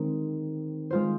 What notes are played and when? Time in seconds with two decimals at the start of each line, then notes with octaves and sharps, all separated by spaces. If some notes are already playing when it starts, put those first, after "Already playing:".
Already playing: D#3 G#3 C4
0.91 G#3 F4 C5